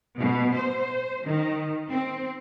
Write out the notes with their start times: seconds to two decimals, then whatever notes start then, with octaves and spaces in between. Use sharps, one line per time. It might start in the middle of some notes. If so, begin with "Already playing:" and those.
0.20 B2
0.54 C5
1.24 D#3
1.89 C4